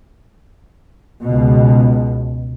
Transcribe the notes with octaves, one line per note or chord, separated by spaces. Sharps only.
C#2 B2